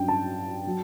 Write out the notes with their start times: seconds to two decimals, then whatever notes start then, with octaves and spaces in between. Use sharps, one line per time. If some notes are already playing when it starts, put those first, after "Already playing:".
Already playing: G2 F#3 C#4 G5
0.08 A5
0.67 F#3